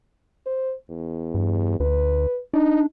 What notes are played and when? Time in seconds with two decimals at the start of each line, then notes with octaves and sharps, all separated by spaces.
0.46 C5
0.90 E2
1.35 G2
1.80 D2 B4
2.54 D4 D#4